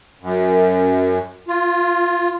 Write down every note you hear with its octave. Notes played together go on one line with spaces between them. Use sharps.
F#2
F4